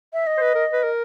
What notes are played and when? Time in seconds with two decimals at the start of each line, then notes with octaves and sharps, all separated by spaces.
0.13 E5
0.27 D#5
0.38 C5
0.41 B4
0.55 A#4
0.72 B4
0.83 A#4